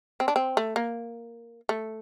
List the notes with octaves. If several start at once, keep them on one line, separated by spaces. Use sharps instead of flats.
C4
D4
C4
A3
A#3
A3